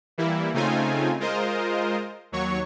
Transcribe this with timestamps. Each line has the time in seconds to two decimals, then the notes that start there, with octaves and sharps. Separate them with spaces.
0.18 E3 G3 A#3 E4
0.54 C#3 A3 C4 D#4 F4 G#5
1.20 G#3 F4 A#4 C5 D#5
2.32 D#2 F#3 C#5 C#6